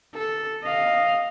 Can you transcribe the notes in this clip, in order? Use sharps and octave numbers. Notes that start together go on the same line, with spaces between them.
A4
D#5 F5